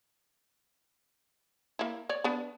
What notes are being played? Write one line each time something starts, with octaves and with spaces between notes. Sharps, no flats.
A#3 E4
C#5 D5
B3 D4